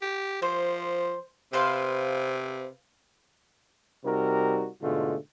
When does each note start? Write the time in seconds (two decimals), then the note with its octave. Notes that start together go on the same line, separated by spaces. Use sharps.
0.02 G4
0.42 F3 C5
1.53 C3 B4 C5 F5
4.05 C3 G3 D#4 F#4 A#4
4.82 G#2 B2 D3 G#3 A3 F4